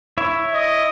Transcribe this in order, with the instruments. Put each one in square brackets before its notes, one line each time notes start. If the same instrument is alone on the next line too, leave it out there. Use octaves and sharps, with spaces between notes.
[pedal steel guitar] E4 C#5 E5
[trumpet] D#5